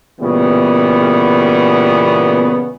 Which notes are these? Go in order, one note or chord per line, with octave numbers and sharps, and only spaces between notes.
A#2 C#3 E3 G3 B3